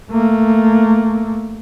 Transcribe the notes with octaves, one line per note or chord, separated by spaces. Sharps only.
A3 A#3